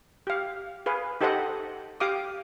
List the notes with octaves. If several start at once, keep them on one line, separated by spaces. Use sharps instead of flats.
G4 F5
G#4 B4 F5
D#4 G4 A4 C5 D#5 F#5
G4 F5 D6 D#6